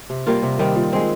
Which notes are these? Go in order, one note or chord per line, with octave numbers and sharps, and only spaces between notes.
C3
G3 A#3 F4
C3
D#3 G3 C4
A#2
G#3 C4